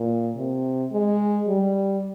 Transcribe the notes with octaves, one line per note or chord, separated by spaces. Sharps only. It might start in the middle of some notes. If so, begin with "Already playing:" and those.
Already playing: A#2
C3
G#3
G3